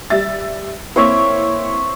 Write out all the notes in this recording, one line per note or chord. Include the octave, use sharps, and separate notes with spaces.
G3 E5 A6
A#3 C4 E4 C5 C#5 E5